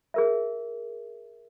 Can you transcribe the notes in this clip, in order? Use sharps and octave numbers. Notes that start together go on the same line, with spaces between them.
G#4 A#4 E5